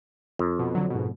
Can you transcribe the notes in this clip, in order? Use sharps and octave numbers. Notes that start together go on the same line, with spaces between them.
F2
B2
D3 F#3
G#2 B2